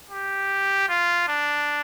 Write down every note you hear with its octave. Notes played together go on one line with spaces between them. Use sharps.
G4
F4
D4